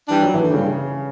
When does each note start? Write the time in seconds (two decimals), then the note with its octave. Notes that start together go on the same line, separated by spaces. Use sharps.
0.08 E3 G3 D4
0.23 F#3
0.34 E3
0.43 D3
0.53 G2 C#3